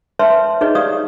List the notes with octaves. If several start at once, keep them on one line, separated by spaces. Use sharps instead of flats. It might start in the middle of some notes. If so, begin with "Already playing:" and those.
B4 C#5 E5 A5 C6
D#4 G#4 B4 C#5 D#5
G4 C#5 D5 F5 D#6